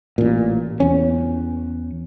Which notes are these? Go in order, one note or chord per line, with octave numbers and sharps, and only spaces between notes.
A1 A#2
E2 C#4